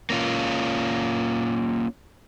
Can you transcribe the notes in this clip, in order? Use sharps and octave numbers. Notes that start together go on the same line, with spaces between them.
A#3 C#4 F4